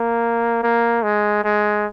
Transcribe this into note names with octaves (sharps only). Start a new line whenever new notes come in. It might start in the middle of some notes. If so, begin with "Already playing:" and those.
Already playing: A#3
A#3
G#3
G#3